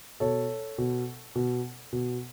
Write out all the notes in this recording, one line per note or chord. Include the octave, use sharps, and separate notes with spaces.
B2 A4 C#5
B2
B2
B2